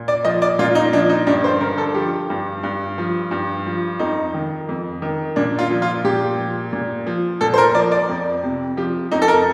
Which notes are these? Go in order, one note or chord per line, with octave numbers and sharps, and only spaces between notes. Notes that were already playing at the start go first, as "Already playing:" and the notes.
Already playing: A#2
D5
F3 D#5
D5
A#2 F4
D#4
F3 D4
D#4
G2 D4
C5
D3 A#4
A4
F3 G4
G2
G2
F3
G2
F3
F2 D#4
D#3
F2
D#3
A#2 D4
F4
F3
F4
A#2 G4
F3
A#2
F3
A#2 A4
C5
A#4
F3 D5
D5
F2
C3
F3 G4
F2 D#4
A4
A#4